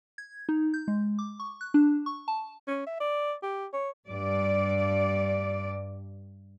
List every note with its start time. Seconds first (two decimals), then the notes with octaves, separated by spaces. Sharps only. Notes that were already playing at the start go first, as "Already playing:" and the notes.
0.18 G#6
0.49 D#4
0.74 G6
0.88 G#3
1.19 D6
1.40 C#6
1.61 F#6
1.74 D4
2.06 C#6
2.28 A5
2.67 C#4
2.86 E5
3.00 D5
3.43 G4
3.73 C#5
4.09 G2 D5